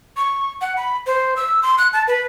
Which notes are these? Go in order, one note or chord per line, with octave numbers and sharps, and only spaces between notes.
C#6
F#5
B5
C5
E6
C6
F#6
A5
B4